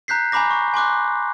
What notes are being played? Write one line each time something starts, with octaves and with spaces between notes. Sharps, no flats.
A#5 F#6 G6 B6 C7
G#5 A#5 B5 D6 A#6
C#6
G#5 C6 D6 F#6